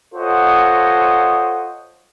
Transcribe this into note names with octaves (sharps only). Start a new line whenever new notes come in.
F4 A4 C5 C#5 D#5 F#5